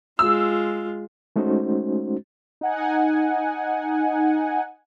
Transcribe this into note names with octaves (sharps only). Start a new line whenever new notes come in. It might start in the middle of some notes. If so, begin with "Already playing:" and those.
G#3 F4 E6
G#3 A3 C#4 D#4 F#4 C5
D#4 F#5 G#5